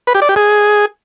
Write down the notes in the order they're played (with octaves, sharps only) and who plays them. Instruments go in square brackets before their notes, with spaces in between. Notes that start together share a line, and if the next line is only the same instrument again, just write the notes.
[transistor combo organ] B4
G4
D5
G4
G#4